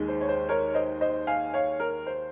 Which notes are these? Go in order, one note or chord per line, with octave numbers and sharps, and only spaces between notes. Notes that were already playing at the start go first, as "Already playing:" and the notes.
Already playing: D#2 D#3 G#3
C5
C#5
C5
A#4 C#5
C5 D#5
C5 D#5
F5 G#5
C#5 F5
A#4
C5